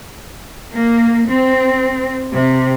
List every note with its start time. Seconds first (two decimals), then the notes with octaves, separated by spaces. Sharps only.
0.73 A#3
1.27 C4
2.33 C3